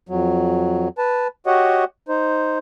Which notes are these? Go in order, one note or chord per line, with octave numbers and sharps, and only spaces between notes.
F2 F#3
B4 A5
F#4 G4 C#5 D#5 F#5
D#4 C5